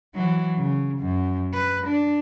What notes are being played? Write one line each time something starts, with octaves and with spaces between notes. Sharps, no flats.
E3 F#3
C#3
F#2
B4
D4